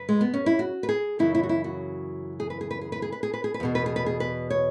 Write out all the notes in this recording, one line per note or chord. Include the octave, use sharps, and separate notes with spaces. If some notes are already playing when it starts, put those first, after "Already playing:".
Already playing: F#2 C#3 B4
G#3
B3
C#4
E4
F#4
B4
G#4
F#2 C#3 E3 E4
E4
F#4
E4
F#4
G#4
B4
G#4
B4
G#4
B4
G#4
B4
G#4
B4
G#4
B4
E2 B2 G#4
B4
G#4
B4
G#4
B4
C#5